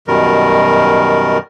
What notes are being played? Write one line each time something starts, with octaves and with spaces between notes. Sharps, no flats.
F#2 B2 D#3 G3 A#4